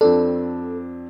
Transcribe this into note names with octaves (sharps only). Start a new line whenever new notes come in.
F2 C4 D4 A4